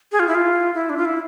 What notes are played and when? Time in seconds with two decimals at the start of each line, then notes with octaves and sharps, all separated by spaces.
0.12 G#4
0.19 F4
0.27 E4
0.35 F4
0.74 E4
0.90 D4
0.97 F4
1.05 E4